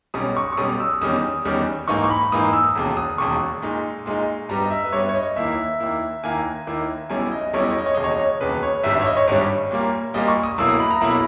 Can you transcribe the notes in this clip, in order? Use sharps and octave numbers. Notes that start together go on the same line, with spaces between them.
B1 B2 G3 C#4 D#6
C#6
C#6
B1 B2 G3 C#4 D#6
E6
E2 D#3 G3 C#4 D#6
E2 D#3 G3 C#4
G#2 E3 A#3 D#4 C#6
C#6
B5
G#2 E3 A#3 D#4 D#6
E6
E1 D#2 C#3
D#6
E1 D#2 C#3 C#6
A#2 G#3 D#4
A#2 G#3 D#4
G2 G3 B3 A#5
D#5
E5
B4
G2 G3 B3 C#5
C#5
D#5
D#2 D#3 A#3 E4 E5
D#2 D#3 A#3 E4
D#2 D#3 A#3 E4 G#5
D#2 D#3 A#3 E4
B1 B2 G3 C#4 E4 G#5
D#5
B1 B2 G3 C#4 E4 C#5
D#5
C#5
D#5
C#5
E1 D#2 C#3 D#5
C#5
D#5
C#5
E1 D#2 C#3 B4
C#5
G#1 G2 G3 E5
E5
C#5
D#5
C#5
G#1 G2 G3 C#5
A#2 G3 A#3
A#2 G3 A#3 D#5
C#6
D#6
B1 B2 A#3 E4 E6
D#6
B5
A#5
B1 B2 A#3 E4 B5